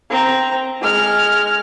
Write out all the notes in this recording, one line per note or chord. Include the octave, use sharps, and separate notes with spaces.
C4 A#5
G#3 F6